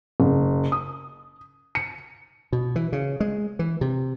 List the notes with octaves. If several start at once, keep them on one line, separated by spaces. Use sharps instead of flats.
F#1
D#6
C#7
B2
E3
C#3
G#3
E3
C3